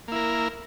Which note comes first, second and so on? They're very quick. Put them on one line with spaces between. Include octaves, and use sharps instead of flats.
A#3 E4 A#4